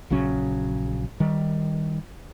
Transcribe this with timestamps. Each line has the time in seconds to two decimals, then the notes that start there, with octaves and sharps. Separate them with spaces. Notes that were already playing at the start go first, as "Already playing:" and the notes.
0.10 A#1 C#3 F#3 C#4
1.20 D#3 G3